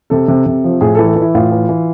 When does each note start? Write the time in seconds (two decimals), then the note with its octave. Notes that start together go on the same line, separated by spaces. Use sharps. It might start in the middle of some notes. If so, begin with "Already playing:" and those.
0.10 C3 A4
0.28 C3
0.46 C3
0.64 F3
0.81 A2 G#4
0.95 A4
0.99 E3
1.07 A4
1.16 E3
1.22 E4
1.35 A2 F4
1.52 E3
1.69 E3